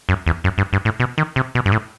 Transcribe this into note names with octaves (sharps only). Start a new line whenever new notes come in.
F#2
E2
F#2
G2
G2
A2
B2
D#3
C3
B2
G2
A2